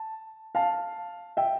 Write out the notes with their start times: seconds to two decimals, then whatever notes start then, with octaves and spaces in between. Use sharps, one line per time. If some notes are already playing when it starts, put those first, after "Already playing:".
Already playing: A5
0.55 F5 A5
1.37 E5 G5